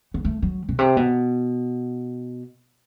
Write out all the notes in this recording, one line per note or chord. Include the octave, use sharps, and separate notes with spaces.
B3
A3
F#3
B2
C3
B2